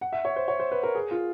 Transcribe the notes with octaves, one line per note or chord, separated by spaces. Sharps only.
F#5
E5
C#5
C5
C#5
C5
B4
A#4
G#4
F4